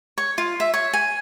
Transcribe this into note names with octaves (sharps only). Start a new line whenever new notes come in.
C#5
F4
E5
C#5
G#5